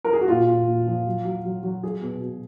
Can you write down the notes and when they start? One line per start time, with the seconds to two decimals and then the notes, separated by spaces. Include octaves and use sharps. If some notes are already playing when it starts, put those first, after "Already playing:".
0.05 A#4
0.13 G#4
0.21 F#4
0.28 A#2 F4
0.49 A#2
0.67 A#2
0.87 F3
1.06 F#3
1.25 F#3
1.45 F#3
1.63 F#3
1.83 F#3 G#4
2.02 B2
2.22 B2